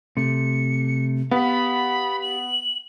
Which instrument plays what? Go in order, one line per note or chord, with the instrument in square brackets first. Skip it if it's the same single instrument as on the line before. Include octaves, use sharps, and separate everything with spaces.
[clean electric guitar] C3 A3 [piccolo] C#7
[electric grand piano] B3 [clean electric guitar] G4 F5 [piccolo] B5
[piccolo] F#7